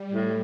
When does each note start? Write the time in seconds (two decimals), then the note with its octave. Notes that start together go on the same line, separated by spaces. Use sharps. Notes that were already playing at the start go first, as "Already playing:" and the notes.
Already playing: G3
0.12 A2